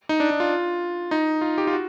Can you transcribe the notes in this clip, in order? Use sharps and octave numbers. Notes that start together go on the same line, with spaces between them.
D#4
D4
D#4
F4
D#4
F4
G4
F4
F#4